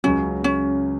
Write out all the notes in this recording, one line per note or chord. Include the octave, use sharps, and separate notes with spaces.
C#2 C#3 F#3 C#4
C#4